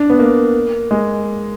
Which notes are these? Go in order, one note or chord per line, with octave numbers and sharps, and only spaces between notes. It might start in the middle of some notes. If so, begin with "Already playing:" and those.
Already playing: D4
B3
A#3
G#3